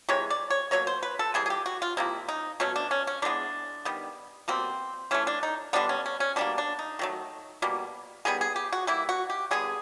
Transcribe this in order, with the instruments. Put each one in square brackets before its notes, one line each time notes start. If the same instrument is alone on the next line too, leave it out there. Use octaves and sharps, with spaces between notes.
[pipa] C3 E3 G#3 C#5
D5
C#5
B2 F#3 A#3 C#5
C5
B4
A4
C3 E3 G3 G#4
G#4
G4
F#4
F4
C3 F3 A#3 E4
D#4
B2 F#3 A3 C#4
D4
C#4
C#4
E3 G#3 B3 D4
D#3 G3 B3
B2 G3 A#3 C4
E3 A3 C#4
D4
D#4
D3 G3 B3 D4
C#4
C#4
C#4
B2 G3 A#3 D4
D4
D#4
D#3 F#3 A3
B2 G3 A#3
D#3 G3 B3 G#4
G#4
G4
F#4
E3 G3 A#3 E4
F#4
G4
D3 G3 B3 G#4